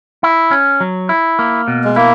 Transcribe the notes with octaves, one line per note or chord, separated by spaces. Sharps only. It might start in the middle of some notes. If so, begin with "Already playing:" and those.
E4
C#4
F#3
E4
A#3
B2
G#3
A#3 E4